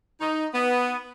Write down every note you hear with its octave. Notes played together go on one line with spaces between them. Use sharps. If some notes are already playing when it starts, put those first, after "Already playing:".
D#4
B3